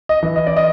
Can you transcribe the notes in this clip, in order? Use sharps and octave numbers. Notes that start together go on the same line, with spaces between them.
D#5
E3
D#5
D5
D#5